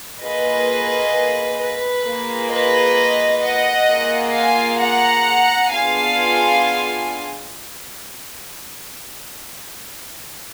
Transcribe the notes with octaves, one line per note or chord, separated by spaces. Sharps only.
A#3 F4 G#4 B4 D#5
B4
A#3 F4 G#4
B4 D#5
D#5 F#5
A#3 F4 G#4
F5 G#5
F#5 A#5
B3 D4 F4 G#4 F5 G#5